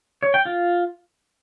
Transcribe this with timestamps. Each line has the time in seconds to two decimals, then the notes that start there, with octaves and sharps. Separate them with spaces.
0.23 C#5
0.34 G5
0.45 F4